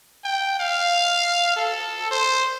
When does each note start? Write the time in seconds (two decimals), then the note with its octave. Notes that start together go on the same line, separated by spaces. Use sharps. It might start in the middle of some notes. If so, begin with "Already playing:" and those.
0.24 G5
0.60 F5
1.56 A4
2.11 C5